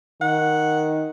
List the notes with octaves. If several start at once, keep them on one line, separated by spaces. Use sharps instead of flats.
D#3 F#5